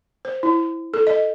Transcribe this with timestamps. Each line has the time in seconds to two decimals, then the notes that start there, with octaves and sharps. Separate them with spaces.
0.25 C5
0.43 E4
0.94 A4
1.07 D#5